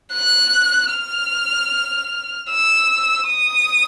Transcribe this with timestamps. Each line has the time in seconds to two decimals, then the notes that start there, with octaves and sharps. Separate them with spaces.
0.14 F#6
0.93 F6
2.50 E6
3.29 D#6